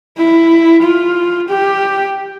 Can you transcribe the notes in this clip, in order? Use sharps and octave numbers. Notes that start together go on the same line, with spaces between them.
E4
F4
G4